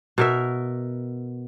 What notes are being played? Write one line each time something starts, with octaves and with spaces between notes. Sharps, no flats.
B2 A#4 E5